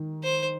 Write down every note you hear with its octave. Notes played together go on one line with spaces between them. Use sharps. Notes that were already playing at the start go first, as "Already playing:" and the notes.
Already playing: D#3
C5